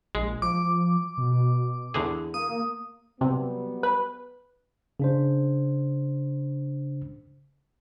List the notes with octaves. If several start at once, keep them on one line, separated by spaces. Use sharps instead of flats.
A#1 G#3
F3 D6
B2
E2 D3 G#4
A#3 D#6
C3 F#3 G3 B3
B4
C#3 D4 C5